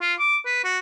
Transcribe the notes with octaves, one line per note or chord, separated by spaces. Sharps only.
F4
D6
B4
F#4